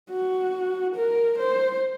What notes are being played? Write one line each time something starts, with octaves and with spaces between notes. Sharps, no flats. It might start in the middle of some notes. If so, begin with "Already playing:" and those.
F#4
A#4
C5